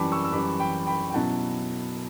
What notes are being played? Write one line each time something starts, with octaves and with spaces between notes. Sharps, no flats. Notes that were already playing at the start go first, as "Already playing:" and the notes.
Already playing: F#2 E3 G3 A5 B5 C#6 D6
C#6 E6
E6
F#2 E3 G3 B5 D6
G5 B5
G5 B5
G5
B2 F#3 C#4 E4 F#5 A5